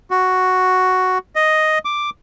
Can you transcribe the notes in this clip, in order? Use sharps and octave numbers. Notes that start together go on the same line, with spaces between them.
F#4
D#5
D6